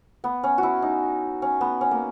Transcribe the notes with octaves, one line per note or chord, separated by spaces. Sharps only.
B3
C#4
E4 F#4
D#4
C#4
B3
C#4
A#3